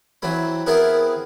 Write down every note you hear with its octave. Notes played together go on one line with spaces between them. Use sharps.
E3 F#3 C4 B5
B3 C4 E4 G#4 A#4 B4